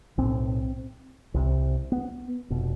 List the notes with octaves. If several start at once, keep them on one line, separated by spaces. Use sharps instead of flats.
B1 A2 C4
C2 C3
B3
F1 B2